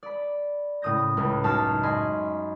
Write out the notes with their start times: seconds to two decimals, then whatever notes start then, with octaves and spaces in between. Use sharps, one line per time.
0.03 D5 B5
0.82 A2 C#3 D#6 G6 A#6
1.17 C#2 A2 C#3
1.44 F#2 D#4 F5 A5 F6 B6
1.83 D#5 G#5 B5 C6